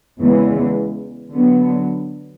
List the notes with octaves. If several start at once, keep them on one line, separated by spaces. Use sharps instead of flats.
E2 C#3 E3 G#3
D3 F#3 B3